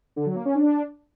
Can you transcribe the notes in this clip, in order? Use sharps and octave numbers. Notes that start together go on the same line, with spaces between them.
D3
F#3
A#3
C#4
D4